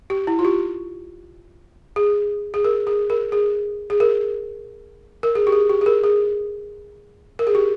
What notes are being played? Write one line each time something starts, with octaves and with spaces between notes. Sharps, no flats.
G4
E4
F4
G4
G#4
G#4
A#4
G#4
A#4
G#4
G#4
A#4
A#4
G#4
G4
G#4
G4
G#4
A#4
G#4
A#4
G#4
G4